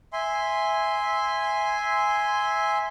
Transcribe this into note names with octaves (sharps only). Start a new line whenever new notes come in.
E5 G#5 C6